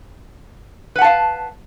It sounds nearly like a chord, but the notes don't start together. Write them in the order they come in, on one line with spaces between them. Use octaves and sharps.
B4 F#5 A5 F5